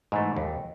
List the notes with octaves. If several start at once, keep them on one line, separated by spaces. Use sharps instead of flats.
G#2 E3 A3
D#2